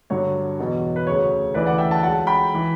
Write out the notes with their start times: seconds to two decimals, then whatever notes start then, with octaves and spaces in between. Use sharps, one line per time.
0.10 G2 D3 F#3 C#5
0.59 E2 B2 F#3
0.96 B4
1.06 D2 C#3 F#3 C#5
1.54 D2 C#3 E3 B4 D5
1.66 D5 F#5
1.78 E5 G5
1.91 F#5 A5
2.02 C#2 C#3 F#3 F#5 A5
2.27 G5 B5
2.54 E3